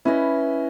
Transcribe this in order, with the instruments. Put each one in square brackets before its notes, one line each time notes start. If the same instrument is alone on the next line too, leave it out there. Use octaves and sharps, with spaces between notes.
[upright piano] C#4 [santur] E4 B4 D#5